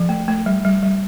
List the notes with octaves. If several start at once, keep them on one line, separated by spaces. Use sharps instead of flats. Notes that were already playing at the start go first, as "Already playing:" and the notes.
Already playing: F3
A3
A3
G3
G3
G3